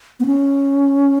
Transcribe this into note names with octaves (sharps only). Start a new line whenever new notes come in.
B3
C#4